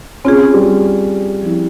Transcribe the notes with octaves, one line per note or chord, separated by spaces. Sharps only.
C4 C#4 F4 G#4
G3
F3 C4 E4